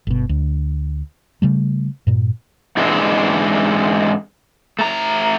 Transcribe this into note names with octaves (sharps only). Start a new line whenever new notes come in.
G1 B2
D2
C#3 G3 A3
G2 A#2
G#2 E3 G#3 C4 D4
A3 A#5